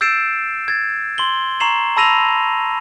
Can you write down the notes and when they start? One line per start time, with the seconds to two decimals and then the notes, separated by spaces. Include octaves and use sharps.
0.01 E6 G6 A6 C7 D7 E7
0.68 G#6 A6
1.18 C6 F#7 G7
1.60 A#5 C#6 C7 E7 F#7
1.97 A5 B5 E6 A#6 D#7 F7